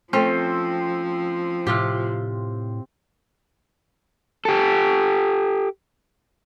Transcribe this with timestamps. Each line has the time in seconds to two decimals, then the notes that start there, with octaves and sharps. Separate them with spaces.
0.13 F3 A3 C4 C#4 C5
1.67 A2 C3 F4 G4
4.45 G4 A4